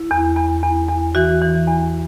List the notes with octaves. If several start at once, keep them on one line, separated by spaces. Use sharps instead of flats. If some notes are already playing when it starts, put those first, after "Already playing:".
Already playing: E4
E2
E2
E2
E2
E3 F#4
E3
E2